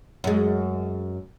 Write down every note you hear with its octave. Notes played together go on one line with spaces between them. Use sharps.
F#2 G#3